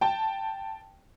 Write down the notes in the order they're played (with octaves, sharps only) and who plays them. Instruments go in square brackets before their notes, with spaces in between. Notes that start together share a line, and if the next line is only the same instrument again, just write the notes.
[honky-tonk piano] G5 A5